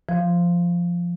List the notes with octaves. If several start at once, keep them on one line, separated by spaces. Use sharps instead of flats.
F3